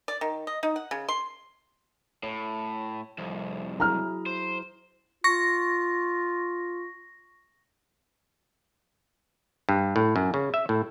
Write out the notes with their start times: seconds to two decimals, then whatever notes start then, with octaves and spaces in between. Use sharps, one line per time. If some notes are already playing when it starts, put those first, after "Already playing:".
0.08 D5
0.21 D#3
0.47 D#5
0.63 D#4
0.76 F#5
0.91 C#3
1.09 C6
2.23 A2 C#5
3.18 C2 F2
3.80 F#3 E4 G#4 A#5 F6
4.26 C5
5.24 F4 C#6 A#6
9.69 G2
9.96 A2
10.16 F#2
10.34 C#3
10.54 E5
10.69 A2